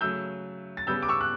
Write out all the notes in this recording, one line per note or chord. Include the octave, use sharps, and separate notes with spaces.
C#3 F#3 A3 E6 G6
A6
C#3 G3 B3 E6 G6
D6
C#6 E6
F#6